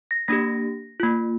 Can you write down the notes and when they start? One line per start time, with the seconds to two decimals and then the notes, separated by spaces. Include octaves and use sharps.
0.11 A#6
0.28 A#3 D4 G4 A#6
1.00 A#3 F4